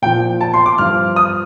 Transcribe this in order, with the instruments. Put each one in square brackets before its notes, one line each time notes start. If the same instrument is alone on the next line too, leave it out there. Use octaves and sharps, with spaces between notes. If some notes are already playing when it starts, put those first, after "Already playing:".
[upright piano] A#2 F3 G5
A5
C6
D6
G2 F3 F6
D#6